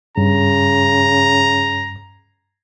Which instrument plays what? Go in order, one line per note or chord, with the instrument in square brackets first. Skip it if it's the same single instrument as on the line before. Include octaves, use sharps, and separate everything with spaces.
[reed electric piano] G2 [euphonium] C#3 [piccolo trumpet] A#5